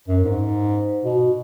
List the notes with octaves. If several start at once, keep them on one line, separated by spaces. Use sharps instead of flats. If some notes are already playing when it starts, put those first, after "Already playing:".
F#2
G#2
B2